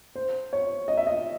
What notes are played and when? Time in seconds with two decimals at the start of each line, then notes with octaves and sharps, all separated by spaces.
0.16 C5
0.53 C#5
0.88 D#5
0.97 E5
1.07 D#5